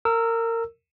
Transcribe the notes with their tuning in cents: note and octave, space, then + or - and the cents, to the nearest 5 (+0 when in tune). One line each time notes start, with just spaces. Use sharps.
A#4 -25 E6 +0